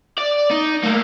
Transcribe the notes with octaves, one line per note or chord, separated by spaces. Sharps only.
D5
D#4
A3 A#3